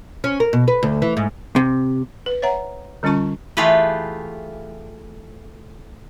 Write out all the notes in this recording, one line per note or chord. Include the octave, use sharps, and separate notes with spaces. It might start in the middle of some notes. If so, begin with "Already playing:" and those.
C#4
A#4
B2
B4
D2
E3
G#2
C3
B4
C#5 E5 F#5 A#5
D3 G3 C#4 F4 A5 C#6
E3 A3 F4 G4 G#4 B4